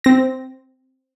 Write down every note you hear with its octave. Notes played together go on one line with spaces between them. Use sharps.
C4 A#6